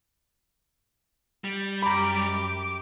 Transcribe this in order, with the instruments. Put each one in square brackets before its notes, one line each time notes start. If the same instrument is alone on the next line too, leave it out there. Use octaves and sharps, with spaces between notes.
[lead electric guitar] G3
[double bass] F#2 [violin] G4 D6 [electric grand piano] A#5 B5